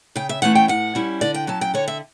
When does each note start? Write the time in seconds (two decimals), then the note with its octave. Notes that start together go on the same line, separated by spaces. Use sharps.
0.16 C#3 G5
0.29 E5
0.42 E3 A3 C#4 E4 F#5
0.55 G5
0.68 A2 F#5
0.95 G3 C#4 E4
1.21 D3 D5
1.34 G5
1.47 F#3 C#4 A5
1.61 G5
1.74 D3 C#5
1.88 E5